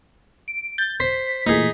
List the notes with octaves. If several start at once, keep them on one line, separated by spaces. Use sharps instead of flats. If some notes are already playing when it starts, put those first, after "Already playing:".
D7
G6 A6
C5 B6
A#2 E3 A3 D#4 G#4